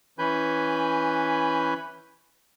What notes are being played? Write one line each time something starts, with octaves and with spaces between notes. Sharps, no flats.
E3 C#4 B4 G#5 B5 G6